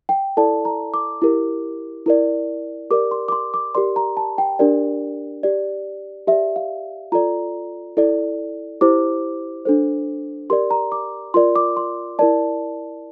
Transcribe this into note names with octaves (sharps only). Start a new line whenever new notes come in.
G5
E4 A4 D5 A5
A#5
D6
E4 G4 A#4
E4 A#4 D5
G4 A#4 D5 D6
C6
D6
C6
D6
G4 A#4 D5 C6
A#5
A5
G5
D4 G4 A#4 D5
G4 D5
G4 D5 E5
F5
F4 A4 D5 A#5
E4 A4 D5
E4 G4 C5 D6
D4 A4 C5
G4 A#4 D5 C6
A#5
D6
F4 A#4 D5 C6
D6
C6
E4 A#4 D5 A5